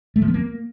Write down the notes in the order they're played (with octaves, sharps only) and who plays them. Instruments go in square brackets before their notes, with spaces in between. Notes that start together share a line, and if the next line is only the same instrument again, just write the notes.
[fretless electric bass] A3
F3
B3
A#3